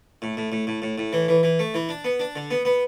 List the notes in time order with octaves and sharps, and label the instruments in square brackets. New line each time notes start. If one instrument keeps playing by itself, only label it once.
[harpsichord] A2
A2
A2
A2
A2
A2
E3
E3
E3
A3
E3
D4
B3
D4
D3
B3
B3